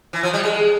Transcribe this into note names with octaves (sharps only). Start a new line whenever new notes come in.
E3
F3
G3
G#3